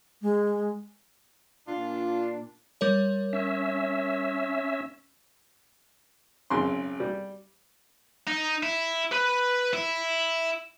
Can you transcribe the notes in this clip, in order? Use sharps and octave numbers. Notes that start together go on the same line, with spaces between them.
G#3
A#2 D4 F4
G3 A#4 C#5
C#4 E5
G#1 F#2 C#3 C6
G3
D#4
E4
B4 B5
E4